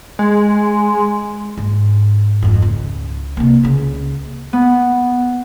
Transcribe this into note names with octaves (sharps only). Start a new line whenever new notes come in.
G#3
G#2
G#1 F2
C#2
C3 A#3
C#2 C#3
B3